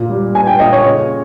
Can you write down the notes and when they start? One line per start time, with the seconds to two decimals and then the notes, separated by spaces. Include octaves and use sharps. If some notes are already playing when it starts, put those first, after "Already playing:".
Already playing: A#2
0.10 G3
0.35 A#2 G#5
0.47 G5
0.60 A#2 D#5
0.73 C#5
0.86 C#3